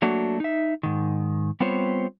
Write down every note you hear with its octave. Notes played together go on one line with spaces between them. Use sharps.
F#3 A3 A#3 D4 F#4
D#4 E5
G#2 D#3
G3 B3 C4 F4 C5 C#5